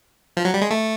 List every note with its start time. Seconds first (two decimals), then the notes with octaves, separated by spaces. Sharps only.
0.37 F3
0.45 F#3
0.54 G3
0.61 G#3
0.71 A3